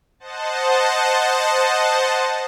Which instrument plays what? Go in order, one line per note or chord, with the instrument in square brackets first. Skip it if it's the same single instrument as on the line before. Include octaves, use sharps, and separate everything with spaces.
[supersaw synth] C5 D#5 F#5 A5